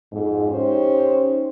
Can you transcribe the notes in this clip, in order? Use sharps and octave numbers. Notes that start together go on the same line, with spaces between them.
F2 G#2
C#4 D#4 G4 C5